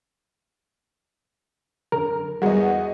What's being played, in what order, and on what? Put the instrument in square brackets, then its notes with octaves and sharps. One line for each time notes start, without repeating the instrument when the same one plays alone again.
[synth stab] F#2 D3 [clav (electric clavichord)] A#4
[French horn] E2 [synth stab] G3 G#3 [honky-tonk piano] F#4 D#5